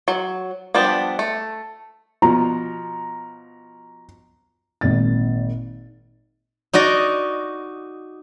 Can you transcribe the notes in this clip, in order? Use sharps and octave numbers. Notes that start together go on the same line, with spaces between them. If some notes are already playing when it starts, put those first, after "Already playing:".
F#3
F3 G3 B3 D4
A3
B2 F3 A#5
G#1 A#2 A6
D#4 F#4 D5 D#5